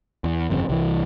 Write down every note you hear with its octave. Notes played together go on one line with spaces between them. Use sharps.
E2
G1 F2 C#3
C2 E3